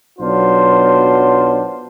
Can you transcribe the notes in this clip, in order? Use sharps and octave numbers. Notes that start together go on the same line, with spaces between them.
B1 F#3 B3 D4 F4 C5